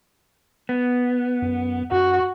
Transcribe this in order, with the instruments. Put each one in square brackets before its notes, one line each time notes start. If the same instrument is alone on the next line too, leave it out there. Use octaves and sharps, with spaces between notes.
[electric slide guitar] B3
[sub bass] F#2
[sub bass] F#2 [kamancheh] F#4